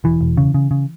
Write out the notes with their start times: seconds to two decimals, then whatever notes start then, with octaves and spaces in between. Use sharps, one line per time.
0.04 E1 E3
0.21 E1
0.37 C#3
0.54 C#3
0.71 C#3